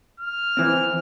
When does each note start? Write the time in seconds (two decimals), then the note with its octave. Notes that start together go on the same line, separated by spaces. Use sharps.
0.20 F6
0.57 E3 C4